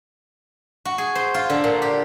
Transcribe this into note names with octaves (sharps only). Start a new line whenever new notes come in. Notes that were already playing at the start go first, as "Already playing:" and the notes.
F#4
G#4
C5
F4
D3
A#2
G4